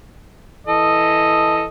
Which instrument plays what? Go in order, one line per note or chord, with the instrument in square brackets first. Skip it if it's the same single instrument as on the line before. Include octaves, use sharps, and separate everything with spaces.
[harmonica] E3 A4 D#5